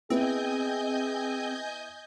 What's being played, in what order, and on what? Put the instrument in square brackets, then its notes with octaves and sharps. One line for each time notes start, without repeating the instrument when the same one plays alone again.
[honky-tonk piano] B3 E4 [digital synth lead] C4 [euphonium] G#4 [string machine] D#5 G#5 G6